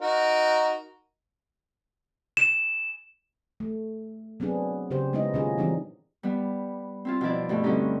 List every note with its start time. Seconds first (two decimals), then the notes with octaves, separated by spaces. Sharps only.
0.01 D#4 F#4 A#4
2.37 E7
3.60 A3
4.40 F#3 B3 C4 D4 G#4
4.91 C#3 G4 C5
5.13 G#3 B3 C#4 D#4 E4 D#5
5.34 A#2 D#3 C#4 F4 G#4 D#5
5.58 E3 G3 C4 D4 D#4
6.23 G3 B3
7.05 C4 E4 F4
7.21 B2 F3 E4 D5
7.49 G2 B2 A3
7.63 D3 G3 C4 C#4 D#4 G4